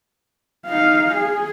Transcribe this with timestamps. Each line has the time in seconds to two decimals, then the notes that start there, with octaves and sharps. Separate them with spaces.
0.67 D#4 F5
1.15 G#4